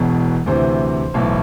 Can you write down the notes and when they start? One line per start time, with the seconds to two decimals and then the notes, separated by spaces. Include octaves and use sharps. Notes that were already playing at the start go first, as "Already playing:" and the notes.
Already playing: E1 E2 B2
0.46 D2 C3 E3 C5
1.14 B1 A2 E3